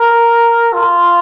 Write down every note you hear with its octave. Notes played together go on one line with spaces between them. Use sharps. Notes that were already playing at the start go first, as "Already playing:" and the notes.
Already playing: A#4
F4